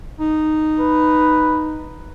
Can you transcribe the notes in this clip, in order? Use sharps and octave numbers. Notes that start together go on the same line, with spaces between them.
D#4
B4